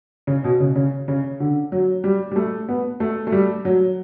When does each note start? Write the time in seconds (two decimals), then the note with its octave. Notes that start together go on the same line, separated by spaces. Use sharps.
0.27 C#3
0.44 B2
0.60 C#3
0.75 C#3
1.08 C#3
1.40 D3
1.72 F#3
2.04 G3
2.31 G3
2.36 A3
2.69 B3
3.00 A3
3.27 A3
3.32 G3
3.65 F#3